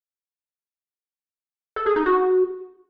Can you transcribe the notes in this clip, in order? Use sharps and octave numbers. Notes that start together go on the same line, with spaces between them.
A4
G#4
D#4
F#4